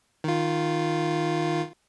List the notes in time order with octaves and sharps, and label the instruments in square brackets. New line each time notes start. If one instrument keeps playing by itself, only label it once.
[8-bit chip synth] D#3 F4